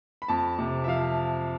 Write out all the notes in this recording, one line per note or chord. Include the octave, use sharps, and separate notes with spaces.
B5
F2 A5
C3
E5
F3 F5